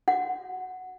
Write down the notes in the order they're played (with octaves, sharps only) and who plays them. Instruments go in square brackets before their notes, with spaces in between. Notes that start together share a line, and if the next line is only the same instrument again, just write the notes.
[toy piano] F#4 F#5